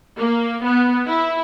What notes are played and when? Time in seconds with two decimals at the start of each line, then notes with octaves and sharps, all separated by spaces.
0.18 A#3
0.64 B3
1.06 E4